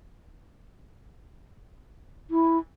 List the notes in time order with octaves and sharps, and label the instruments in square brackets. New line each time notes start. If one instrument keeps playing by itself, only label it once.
[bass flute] E4